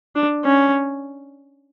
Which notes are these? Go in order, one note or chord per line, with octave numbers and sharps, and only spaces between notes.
D4
C#4